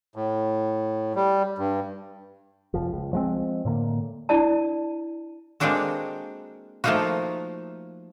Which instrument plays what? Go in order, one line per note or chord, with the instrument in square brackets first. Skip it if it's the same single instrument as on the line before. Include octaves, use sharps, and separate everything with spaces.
[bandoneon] A2
G3
G2
[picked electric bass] F1 F3
C#2
F3 G#3 C4
A2 D3 A#3
[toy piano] D4 E4 D5 A5
[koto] G#3 A#3 C4 D4 F#4 A4
F3 A3 A#3 D#4 F4 F#4